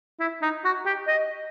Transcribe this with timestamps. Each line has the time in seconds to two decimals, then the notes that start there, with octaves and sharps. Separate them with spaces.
0.20 E4
0.42 D#4
0.65 F#4
0.86 G4
1.08 D#5